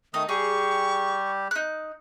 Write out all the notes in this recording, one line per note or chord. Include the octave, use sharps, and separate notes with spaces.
D#3 A3 D#4 D#6
G3 G4 G#4 C#6
D#4 F#6